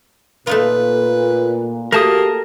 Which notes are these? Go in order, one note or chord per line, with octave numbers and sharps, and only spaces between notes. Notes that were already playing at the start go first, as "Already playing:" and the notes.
A#2 A3 D#4 F4 B4
A3 A#3 F#4 G4 A#4 A5 D#6